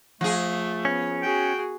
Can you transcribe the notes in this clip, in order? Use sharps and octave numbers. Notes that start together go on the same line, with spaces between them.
F3 A3 G#4
B3 C#4
F#4 G#4 G5